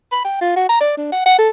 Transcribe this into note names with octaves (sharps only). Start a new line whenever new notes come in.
B5
G5
F4
F#4
A#5
D5
D4
F#5
F#5
A4